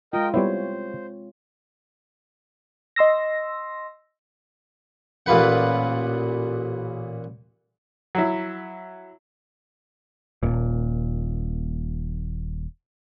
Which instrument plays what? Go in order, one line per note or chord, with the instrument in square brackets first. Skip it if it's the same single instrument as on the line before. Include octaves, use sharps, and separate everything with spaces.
[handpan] G#3 F4 [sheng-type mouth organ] A#4 D#5 G5
[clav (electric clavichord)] G3 B3 E4 [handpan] C4 C#5 [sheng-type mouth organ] C5
[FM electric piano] D#5 C6 E6 A#6
[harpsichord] A1 A#2 F4 B4 F#5
[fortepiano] F#3 E4
[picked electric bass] D#1 A#2